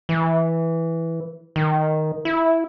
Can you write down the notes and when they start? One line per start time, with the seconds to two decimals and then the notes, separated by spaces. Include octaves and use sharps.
0.09 E3
1.56 D#3
2.25 E4